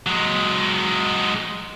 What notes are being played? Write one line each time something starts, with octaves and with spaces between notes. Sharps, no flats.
F#3 G#3